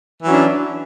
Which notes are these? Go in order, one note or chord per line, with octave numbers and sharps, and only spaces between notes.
E3 F#3 C#4 D4